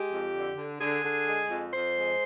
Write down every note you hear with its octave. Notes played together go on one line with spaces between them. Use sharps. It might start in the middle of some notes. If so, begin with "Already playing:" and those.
Already playing: G#3 G4
F2
D3
D3
D3 G#4
D3
G#3
F2
F2 C5
G#3